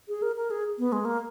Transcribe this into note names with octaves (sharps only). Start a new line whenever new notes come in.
G#4
A#4
A#4
G#4
B3
G#3
A#3